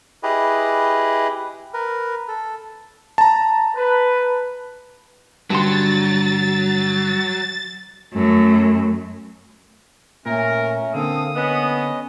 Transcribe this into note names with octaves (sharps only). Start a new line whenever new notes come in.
E4 G4 G#4 B4 D#5
A#4 B4
A4
A5 A#5
B4
G2 D3 F#3 C6 A6
F#2 A3
A#2 A3 C#4 A#4
D3 A#3 C4 A4 F5 D#6
B3 C#4 D#5